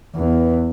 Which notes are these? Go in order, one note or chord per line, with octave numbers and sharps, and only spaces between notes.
E2